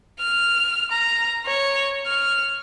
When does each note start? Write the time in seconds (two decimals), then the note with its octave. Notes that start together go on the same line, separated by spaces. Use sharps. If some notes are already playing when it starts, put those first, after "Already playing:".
0.20 F6
0.91 A#5
1.45 C#5
2.06 F6